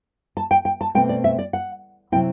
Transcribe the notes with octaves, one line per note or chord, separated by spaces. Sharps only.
A5
G5
G5
A5
B2 A3 C4 G5
D5
E5
D5
F#5
C3 F#3 C4 E4 G5